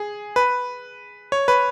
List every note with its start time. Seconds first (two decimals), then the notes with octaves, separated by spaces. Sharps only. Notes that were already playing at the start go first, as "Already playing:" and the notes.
Already playing: G#4
0.36 B4
1.32 C#5
1.48 B4